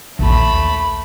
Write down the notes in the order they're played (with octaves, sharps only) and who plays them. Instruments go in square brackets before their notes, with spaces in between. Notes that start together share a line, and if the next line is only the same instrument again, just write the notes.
[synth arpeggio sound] A#1 D#2 [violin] A3 B5